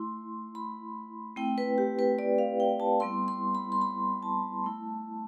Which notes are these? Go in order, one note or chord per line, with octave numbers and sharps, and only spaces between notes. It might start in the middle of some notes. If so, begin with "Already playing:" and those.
Already playing: A3 E4 C6
B5
A3 C4 E4 G5
B4
G4
B4
D5
F5
G5
A5
G3 B3 E4 C6
C6
B5
C6
B5
A5
A3 E4